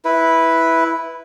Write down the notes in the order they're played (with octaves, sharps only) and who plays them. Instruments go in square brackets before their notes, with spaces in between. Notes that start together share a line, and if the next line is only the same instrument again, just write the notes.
[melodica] E4 B4